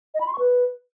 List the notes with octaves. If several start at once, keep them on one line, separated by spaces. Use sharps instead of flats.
D#5
B5
C6
C#6
B4